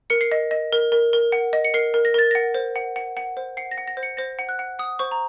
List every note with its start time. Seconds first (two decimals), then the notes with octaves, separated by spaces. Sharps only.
0.10 A#4 C#7
0.21 C7
0.32 D#5
0.51 D#5
0.73 A#4
0.92 A#4
1.13 A#4
1.32 F#5
1.53 D#5
1.65 C#7
1.74 A#4 C7
1.94 A#4
2.05 A#6
2.14 A#4 A6
2.31 F#5 A#6
2.54 C5
2.76 F#5
2.96 F#5
3.17 F#5
3.37 C5
3.57 F#5 C7
3.71 A#6
3.78 F#5
3.88 A#6
3.97 C5
4.03 C#7
4.17 C5 A#6
4.39 F#5
4.49 F#6
4.59 F#5
4.79 F#5 D#6
4.99 C5 C#6
5.11 A#5